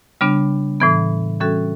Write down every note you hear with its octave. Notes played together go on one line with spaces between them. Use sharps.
C#3 G3 B3 D4
A2 E3 B3
E3 G3 C#4 F#4 A4